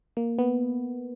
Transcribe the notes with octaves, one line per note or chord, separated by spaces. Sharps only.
A#3
B3